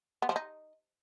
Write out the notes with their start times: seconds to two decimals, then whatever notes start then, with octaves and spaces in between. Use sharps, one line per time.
0.22 B3
0.29 F3
0.36 D#4